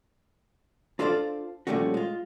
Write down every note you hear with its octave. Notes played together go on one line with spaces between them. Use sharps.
D4 F4 A4 C5 D5 F5
A#2 F3 G3 A3 C#4 F#4
G#3 F4